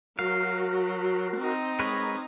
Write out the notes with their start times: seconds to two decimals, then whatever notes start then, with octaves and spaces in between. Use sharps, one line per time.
0.19 F#3 F#4 A#4 F5
1.37 C4 D#4
1.79 G#3 A#4 B4 C#5